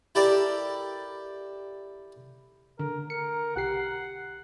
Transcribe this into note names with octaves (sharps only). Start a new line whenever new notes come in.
E4 G4 A4 A#4 D5
D3 A#4
A#4 C#7
B1 G4 F#5 C7